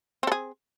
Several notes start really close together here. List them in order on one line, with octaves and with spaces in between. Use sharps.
C4 A4 G#4